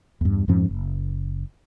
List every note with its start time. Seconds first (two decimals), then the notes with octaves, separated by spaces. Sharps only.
0.21 E2 G2
0.48 F2 G#2 F3 C#4
0.69 F#1